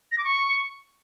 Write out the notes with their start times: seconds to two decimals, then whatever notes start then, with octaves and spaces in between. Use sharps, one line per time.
0.12 A#6
0.18 D6
0.24 C#6